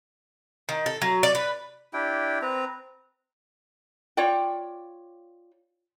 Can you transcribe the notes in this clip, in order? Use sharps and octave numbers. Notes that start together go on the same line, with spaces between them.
D#3
A4
F#3
D5
B4
D4 E4 G4 G5
C4 B4 A#5
F4 C#5 D5 G5